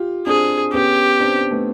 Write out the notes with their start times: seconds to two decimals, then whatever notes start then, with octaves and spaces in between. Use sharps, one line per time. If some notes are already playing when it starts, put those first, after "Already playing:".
Already playing: F4 G4
0.27 C4 D4 G#4
0.73 B3 C#4 G4
1.20 C4 D4
1.51 A3 B3